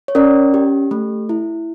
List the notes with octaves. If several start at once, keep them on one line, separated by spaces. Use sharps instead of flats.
C#5
C#4 A#4 D5
G4
A3
E4